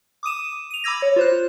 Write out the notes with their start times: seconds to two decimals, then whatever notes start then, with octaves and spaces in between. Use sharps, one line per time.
0.23 D6 D#6 D#7 E7
0.71 D#7 F7
0.84 B5 D6 E6 G#6 A#6
1.02 C#5
1.16 F4 C5 F#6